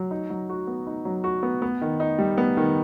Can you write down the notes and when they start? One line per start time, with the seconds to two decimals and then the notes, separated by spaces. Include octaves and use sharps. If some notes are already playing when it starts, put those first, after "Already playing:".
Already playing: F#3
0.11 D#4
0.30 F#3
0.49 F#4
0.67 B3
0.87 D#4
1.05 F#3
1.24 F#4
1.43 B3
1.62 B3
1.81 D#3
2.00 D#4
2.19 G3
2.38 B3
2.57 D#3